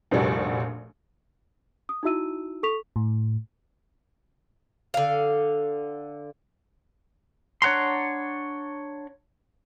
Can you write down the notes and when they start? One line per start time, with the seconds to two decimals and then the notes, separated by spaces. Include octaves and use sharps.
0.11 F1 A#1 A#2 G3 F#4 D5
1.89 D#6
2.03 D#4 E4 F#4 E5 E6 D#7
2.63 A4 C#6 B6 F7
2.96 A2
4.94 D3 F5
7.62 D4 C#5 F#5 A#5 C6